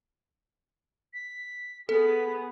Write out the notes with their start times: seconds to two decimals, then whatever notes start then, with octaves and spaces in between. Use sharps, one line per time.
1.14 B6
1.89 B3 G#4 A4 B6